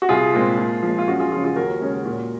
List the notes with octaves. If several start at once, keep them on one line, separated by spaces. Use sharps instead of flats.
F#4
C2 F4 G#4
A#2 G#3 C4
A#2
F3 G#3
F4
F#2 F#4
F4 G#4
C#3 F3 F4
F4 G#4
D#2 F#4 A#4
C#3 G#3 C#4
A#2